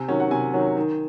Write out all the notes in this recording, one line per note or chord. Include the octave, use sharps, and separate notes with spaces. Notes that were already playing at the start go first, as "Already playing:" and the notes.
Already playing: C3 G#5
D#3 F#3 C#4
F#5
C3 G#5
D#3 F#3 C#4
D#3